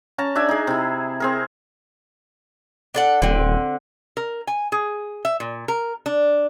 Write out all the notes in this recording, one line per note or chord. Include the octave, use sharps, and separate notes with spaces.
C#4 A5 A#5
D4 D5 E5 G#5
D#4 G#4
C3 E4
C4 G#4 A#4
D4 A4 F#5
D#1 D3 C4
A#4
G#5
G#4
E5
A#2
A#4
D4